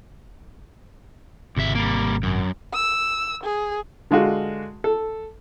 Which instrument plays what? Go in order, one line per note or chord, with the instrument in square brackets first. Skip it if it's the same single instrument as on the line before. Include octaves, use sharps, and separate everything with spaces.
[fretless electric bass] G#1 C3 [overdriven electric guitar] C#2 E5
[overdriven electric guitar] G3 A#3
F#2
[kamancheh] E6
G#4
[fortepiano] D3 G#3 F4 F#4
A4